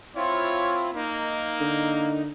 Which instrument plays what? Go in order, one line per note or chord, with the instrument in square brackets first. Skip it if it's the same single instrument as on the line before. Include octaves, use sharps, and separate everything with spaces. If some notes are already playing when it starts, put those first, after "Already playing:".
[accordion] C4 E4 F4 [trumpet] C#5
[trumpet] A#3 [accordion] D#4
[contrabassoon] D3